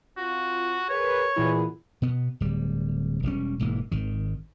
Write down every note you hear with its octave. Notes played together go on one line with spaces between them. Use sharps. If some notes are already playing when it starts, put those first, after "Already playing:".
C4 F4 F#4
G#4 A#4 B4 C#5
A#2 E3 B3 E4 G#4
B2 B3
D1 G3
E1 G3 C#4
E1 G#2 E3 A#3
G#1 D#3